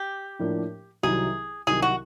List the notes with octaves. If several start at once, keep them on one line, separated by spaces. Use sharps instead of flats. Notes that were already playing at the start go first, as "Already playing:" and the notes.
Already playing: G4
A2 F3 A#3 D4
C2 C3 D#3 F#3 G#4
C2 C3 D#3 F#3 G#4
F#4